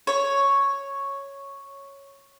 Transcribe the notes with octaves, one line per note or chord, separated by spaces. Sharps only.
C#5